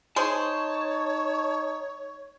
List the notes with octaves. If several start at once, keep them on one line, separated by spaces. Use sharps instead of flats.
D#4 G#4 C5 C#5 A5